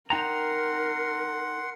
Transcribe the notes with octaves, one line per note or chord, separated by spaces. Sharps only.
D#4 A#4 F#5 G5 A#5 C6